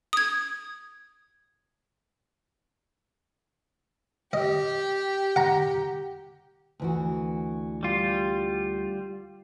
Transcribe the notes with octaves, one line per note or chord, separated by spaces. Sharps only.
D#6 G#6
G4 D#5
F#5 A#5
D2 E3 F#4
G3 F4